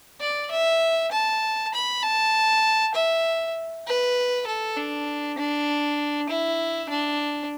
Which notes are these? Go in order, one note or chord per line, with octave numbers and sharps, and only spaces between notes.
D5
E5
A5
B5
A5
E5
B4
A4
D4
D4
E4
D4